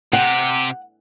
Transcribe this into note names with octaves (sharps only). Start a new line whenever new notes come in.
C3 G4 F#5